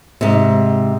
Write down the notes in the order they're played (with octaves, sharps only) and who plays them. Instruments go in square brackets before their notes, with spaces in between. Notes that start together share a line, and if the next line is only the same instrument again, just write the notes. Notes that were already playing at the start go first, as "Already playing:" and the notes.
[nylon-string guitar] G#2 C3